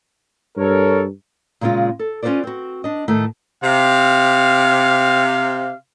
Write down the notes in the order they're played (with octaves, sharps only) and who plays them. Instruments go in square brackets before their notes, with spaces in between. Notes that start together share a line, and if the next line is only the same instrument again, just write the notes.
[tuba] G2 [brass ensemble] A4 A#4 C#5
[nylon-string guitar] A#2 C#3 G#3 C4 F4
A4
C#4 F4 A4 B4 C5 D5
C4 F#4
D4 D#5
A2 D#3 A3
[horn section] C3 F5